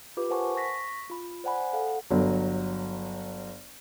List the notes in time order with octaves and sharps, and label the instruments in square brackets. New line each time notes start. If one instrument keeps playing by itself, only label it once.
[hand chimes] F4 G4 B4 D6
A#4 C5 F#5 G#5 A5 C#6
C#6 A#6 B6
F4 B5
C5 D5 F#5 G#5 B5
A4 F5 F#5
[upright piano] G1 F#3